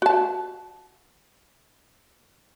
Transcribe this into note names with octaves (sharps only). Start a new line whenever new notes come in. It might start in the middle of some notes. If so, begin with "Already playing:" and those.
F#4 A5